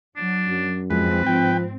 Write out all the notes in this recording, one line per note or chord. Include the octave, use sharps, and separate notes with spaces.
F#3 D4
F#2
F2 G#2 G#3 C4 B4
F3 G5